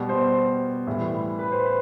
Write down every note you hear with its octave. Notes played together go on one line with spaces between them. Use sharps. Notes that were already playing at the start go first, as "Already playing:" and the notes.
Already playing: B2 G3
C5
A2 E3 G3
B4
C5
B4